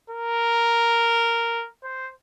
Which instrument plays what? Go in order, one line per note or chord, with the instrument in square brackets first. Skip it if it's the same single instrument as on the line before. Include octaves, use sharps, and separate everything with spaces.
[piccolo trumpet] A#4
C5